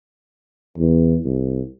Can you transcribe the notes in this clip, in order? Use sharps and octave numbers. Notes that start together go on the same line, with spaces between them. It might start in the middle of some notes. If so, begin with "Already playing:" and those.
E2
C2